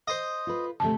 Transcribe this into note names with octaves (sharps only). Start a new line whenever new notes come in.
C5 D#5
F4 B4
D2 C3 A3 A5